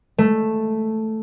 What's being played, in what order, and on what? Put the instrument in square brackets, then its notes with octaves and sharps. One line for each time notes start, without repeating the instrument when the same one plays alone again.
[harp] A3